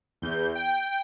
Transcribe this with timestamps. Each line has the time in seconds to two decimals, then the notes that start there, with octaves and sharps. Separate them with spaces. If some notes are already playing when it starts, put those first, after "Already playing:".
0.22 E2 G6
0.55 G5